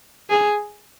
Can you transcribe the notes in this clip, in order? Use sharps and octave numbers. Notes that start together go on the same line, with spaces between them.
G#4